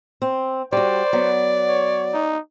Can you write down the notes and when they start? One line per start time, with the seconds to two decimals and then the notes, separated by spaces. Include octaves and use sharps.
0.22 C4
0.73 G3 F#4 C5 D5
1.13 F#3 B3
1.68 C#5
2.14 D#4